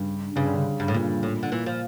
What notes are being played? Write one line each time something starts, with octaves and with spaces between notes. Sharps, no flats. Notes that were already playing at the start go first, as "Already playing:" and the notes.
Already playing: G2 C#3
G2 C#3
D3
C#3
G2
A2
G2 A#2
A2
D3
A#2 E3
F3